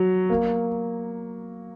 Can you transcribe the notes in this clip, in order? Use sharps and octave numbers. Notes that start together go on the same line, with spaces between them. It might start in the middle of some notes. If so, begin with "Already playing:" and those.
Already playing: F#3
A#3